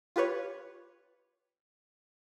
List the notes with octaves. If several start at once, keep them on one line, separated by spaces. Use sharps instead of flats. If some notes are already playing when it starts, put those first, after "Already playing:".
F4 G4 B4 C#5